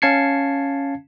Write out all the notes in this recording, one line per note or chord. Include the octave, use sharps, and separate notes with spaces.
C#4 F5 A5 G#6 C7 C#7